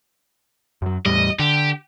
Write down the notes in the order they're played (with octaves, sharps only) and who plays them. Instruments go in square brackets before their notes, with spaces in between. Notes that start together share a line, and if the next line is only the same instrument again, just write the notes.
[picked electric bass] F#2 F#3
[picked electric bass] E2 A2 G3 [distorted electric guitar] D#5
[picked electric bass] D3 [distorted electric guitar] G4